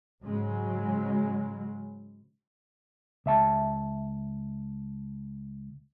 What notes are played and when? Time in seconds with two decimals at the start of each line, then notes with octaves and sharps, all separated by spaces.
0.23 G#2 C#3 F#3 G#3
3.26 C#2 E5 A5